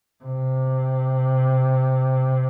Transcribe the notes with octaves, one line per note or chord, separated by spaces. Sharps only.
C3